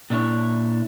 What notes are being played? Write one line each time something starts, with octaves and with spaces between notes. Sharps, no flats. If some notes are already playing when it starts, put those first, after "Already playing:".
A#2 D4 E4 C#5